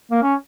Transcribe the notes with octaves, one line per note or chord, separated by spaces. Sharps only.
A#3
C#4